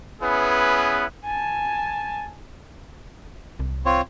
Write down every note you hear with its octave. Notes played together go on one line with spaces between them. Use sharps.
B3 C#4 E4 G#4 B4
G#5 A5
C2
C4 F4 C#5